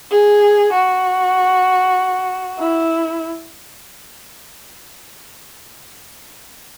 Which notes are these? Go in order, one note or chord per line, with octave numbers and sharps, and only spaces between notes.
G#4
F#4
E4